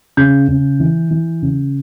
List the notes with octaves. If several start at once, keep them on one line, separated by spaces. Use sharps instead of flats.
C#3 G6
C#3
E3
E3
C#3